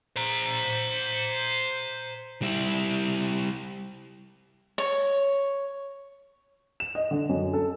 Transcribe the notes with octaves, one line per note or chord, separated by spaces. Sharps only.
C5 A#5
G3 E4
C#5
E7
D#5
D3
F#2
A4